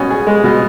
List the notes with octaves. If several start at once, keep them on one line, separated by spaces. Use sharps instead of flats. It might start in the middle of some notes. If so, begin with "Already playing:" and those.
Already playing: B2 C#4
G#4
G#3
B2